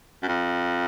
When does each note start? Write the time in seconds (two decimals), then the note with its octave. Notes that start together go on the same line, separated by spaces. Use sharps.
0.23 F#2
0.28 F2